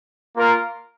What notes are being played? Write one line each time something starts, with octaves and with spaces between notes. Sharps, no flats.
A#3 F4 A#4